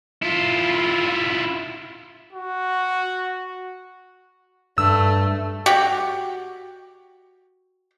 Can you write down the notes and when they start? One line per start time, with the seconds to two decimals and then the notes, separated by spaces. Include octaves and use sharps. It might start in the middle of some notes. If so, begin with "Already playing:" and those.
0.22 E4 F4
2.33 F#4
4.78 G2 A3 E6
5.66 F#4 G4